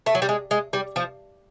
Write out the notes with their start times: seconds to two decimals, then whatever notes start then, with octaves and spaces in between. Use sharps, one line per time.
0.06 A3
0.15 F#3
0.22 G3
0.29 G#3
0.51 G#3
0.73 G3
0.96 F3